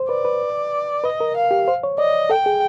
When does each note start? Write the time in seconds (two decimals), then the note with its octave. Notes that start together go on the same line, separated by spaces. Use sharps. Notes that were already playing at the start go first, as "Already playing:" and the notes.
Already playing: C5
0.09 B4 D5
0.25 B4
1.04 B4 D#5
1.20 A#4
1.36 F5
1.51 G4
1.68 C5
1.83 C#5
1.98 D5 D#5
2.30 A4 G5
2.46 G#4